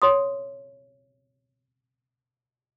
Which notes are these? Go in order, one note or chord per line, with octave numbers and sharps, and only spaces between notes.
C#5 C6 D#6